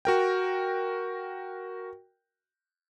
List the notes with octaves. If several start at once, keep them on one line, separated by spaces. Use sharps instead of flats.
F#4 A#4 G5